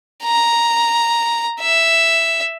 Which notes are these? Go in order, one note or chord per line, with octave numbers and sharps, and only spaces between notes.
A#5
E5